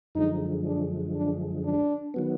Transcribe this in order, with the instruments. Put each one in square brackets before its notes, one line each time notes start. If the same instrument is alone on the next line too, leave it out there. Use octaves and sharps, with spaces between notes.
[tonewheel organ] F#2 D3 F3 G#3 [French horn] D#4
[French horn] D4
D4
D4
[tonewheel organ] D#3 F#3 B3